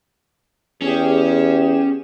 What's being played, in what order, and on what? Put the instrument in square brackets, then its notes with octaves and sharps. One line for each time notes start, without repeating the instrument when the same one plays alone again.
[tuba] E2 [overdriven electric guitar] C#4 [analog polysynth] G4 G#4 E7